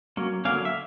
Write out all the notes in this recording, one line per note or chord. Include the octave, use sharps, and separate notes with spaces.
F#3 A#3 C#4
D3 F#3 A#3 C#4 F5
E5